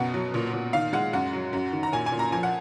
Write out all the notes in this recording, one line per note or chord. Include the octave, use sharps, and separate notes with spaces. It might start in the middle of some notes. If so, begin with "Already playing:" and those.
Already playing: F#2 B2 F#5
F#3
A#2
A#2
D#3 F5
G#3 F#5
F#2 F#5
F#3
F#2
D#3
A#5
A#2 G#5
G#5
A#2
A#5
F3 G#5
F#5